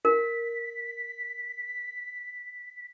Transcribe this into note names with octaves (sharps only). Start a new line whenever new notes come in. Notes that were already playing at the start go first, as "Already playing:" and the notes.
A#4 B6